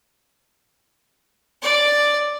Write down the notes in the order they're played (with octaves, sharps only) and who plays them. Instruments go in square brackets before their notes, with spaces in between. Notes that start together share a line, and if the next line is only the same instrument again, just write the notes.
[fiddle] D5